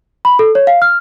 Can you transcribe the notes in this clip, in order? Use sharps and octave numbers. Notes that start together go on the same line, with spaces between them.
B5
A4
C#5
F5
F6